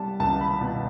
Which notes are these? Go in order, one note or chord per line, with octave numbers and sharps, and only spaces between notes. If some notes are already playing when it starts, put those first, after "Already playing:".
Already playing: G3 B3 A5
C#2 A5
B5
B2